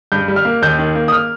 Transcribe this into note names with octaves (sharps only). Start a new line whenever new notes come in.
G2 G6
G3
F6
A#3
D#2 G6
D#3
A#3
D#6
F6